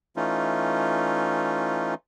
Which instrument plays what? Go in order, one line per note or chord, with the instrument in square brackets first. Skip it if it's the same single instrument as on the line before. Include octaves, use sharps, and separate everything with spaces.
[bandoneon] E3 A3 C#4 D#4 F4